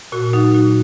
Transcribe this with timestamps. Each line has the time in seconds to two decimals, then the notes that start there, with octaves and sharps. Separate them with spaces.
0.12 A#2 F#4
0.33 F#3 D#4
0.55 A#2 F#4